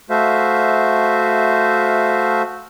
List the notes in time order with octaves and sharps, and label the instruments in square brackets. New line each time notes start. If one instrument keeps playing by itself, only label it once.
[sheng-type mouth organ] A3 F#4 C5 E5 F5